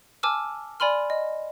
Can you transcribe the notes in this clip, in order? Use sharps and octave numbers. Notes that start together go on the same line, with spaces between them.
G#5 A5 D6 E6 F6
D5 G#5 B5 C6 F6
D#5